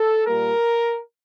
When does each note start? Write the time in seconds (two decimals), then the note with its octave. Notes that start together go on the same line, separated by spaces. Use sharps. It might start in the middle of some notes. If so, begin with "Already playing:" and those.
Already playing: A4
0.27 A#2 G3 A#3 A#4